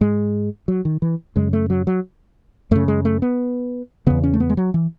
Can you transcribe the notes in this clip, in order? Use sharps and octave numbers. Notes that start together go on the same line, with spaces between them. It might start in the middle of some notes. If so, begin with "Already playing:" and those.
G#2 G#3
F#3
D#3
E3
F#2 C#3 G#3
A3
F#3
F#3
F#2 C#3 A3
G#3
A3
B3
E2 C#3 B3
C#4
A3
B3
G#3
F#3
E3